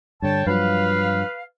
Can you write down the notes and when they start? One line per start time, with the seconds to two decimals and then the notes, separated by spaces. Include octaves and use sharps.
0.22 G2 D3 C#5 G5 A5
0.46 G2 F3 F#3 B4 F5